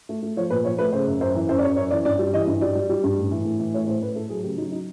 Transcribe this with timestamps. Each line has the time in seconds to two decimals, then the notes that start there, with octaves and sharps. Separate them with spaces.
0.09 A3
0.22 A3
0.37 F3 C#5
0.50 A#2 B4
0.65 F3 C#5
0.79 A3 B4
0.92 C#3 C5
1.07 F#2
1.21 F#2 C5
1.35 E3
1.49 F#2 C5
1.58 D5
1.63 F#2 C#5
1.77 F#2 C#5
1.91 E3 D5
2.05 G2 D5
2.19 G3
2.33 E3 D#5
2.47 G2
2.61 G3 D5
2.75 G3
2.89 G3
3.03 G2
3.17 A2
3.31 E3
3.45 A2
3.60 E3
3.74 A3 C#5
3.87 A2 C5
4.02 A2 B4
4.16 A3 A4
4.30 F#3 G#4
4.43 C#3 G4
4.58 F#3 D#4
4.72 D#4